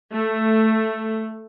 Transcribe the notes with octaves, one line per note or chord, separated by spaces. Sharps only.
A3